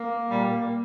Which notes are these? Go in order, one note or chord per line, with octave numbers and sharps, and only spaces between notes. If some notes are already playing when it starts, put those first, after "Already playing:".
Already playing: A#3
A#2 G3